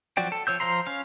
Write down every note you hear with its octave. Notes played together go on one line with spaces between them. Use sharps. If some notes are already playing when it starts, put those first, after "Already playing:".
F3 F#3 F#4 D5 G5
A4
F3 C#5 E6 G6
F3 C5 F5 A#5 C6
C#4 F5